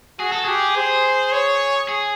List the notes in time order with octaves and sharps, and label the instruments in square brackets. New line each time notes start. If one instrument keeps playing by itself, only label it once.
[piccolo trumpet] F#4 [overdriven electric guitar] G#4
[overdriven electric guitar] A4
[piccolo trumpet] G4 [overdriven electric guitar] G#4
[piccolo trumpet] C5
C#5
[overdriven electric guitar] G#4